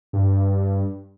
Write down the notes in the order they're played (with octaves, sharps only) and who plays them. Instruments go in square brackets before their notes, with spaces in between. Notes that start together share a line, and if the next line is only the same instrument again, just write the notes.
[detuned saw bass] G2